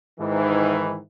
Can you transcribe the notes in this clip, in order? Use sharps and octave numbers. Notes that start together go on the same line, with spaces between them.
G#2 D#3 E3